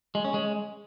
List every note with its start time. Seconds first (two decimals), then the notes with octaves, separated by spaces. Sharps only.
0.15 G#3
0.24 C#4
0.34 G#3